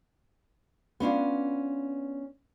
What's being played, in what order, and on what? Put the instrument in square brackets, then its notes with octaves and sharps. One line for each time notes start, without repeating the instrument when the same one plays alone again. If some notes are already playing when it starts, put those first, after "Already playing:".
[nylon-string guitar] B3 C#4 D4 F4